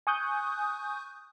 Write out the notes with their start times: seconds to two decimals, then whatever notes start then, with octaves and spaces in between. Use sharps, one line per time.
0.07 G#5 C#6 D#6 F#6 G6